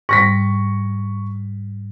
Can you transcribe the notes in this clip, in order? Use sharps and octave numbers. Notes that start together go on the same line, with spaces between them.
G#2 G3 C#6 A#6 B6